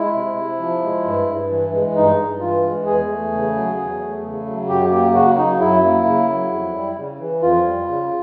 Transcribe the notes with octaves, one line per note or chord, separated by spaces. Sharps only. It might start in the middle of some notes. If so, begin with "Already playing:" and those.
Already playing: G#3 E4
C3
C3
F3
G#3
G2
G2
E3
G#3
G2 D#4
G2
E3 F4
G#3
E2 G#4
A3
C#3
F#3
E2
A3
C#3
F#3
F#2 G4
A#3 G4
C#3 F#4
F#3 D#4
F#2 E4
A#3
C#3
F#3
F2
G3
C#3
E3
F2 F4
G3
C#3